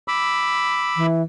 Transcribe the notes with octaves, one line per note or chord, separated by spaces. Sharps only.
B5 D6 E6
E3